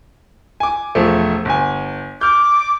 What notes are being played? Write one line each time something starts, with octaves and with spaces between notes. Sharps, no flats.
G#5 D6
E1 F3 A3
G1 G#5
D6 F6 G6